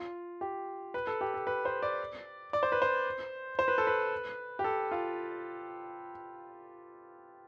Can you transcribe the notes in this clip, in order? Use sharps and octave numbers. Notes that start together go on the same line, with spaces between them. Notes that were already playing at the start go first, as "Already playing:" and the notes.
Already playing: F4
G4
B4
A4
G4
A4
B4
C5
D5
D5
C5
B4
C5
C5
B4
A4
B4
G4
A4
F4